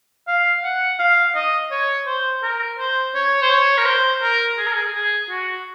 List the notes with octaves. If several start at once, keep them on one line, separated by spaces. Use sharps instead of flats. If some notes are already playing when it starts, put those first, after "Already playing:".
F5
F#5
F5
D#5
C#5
C5
A#4
C5
C#5
C5
C#5
A#4
C5
A#4
G#4
A#4
G#4
G#4
F#4